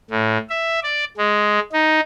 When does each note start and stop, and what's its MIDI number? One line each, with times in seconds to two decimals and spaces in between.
0.11 0.38 45
0.49 0.79 76
0.83 1.04 74
1.17 1.59 56
1.73 2.00 63